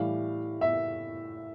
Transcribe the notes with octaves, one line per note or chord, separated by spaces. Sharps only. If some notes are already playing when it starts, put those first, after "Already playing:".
Already playing: A2 E3 G3 F5
E5